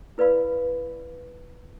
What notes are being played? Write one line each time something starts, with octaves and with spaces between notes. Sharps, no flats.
E4 B4 D5 F5 B5